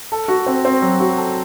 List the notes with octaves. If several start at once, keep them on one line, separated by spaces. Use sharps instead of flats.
A4
F#4
C4
C4
F#3
F#4
A4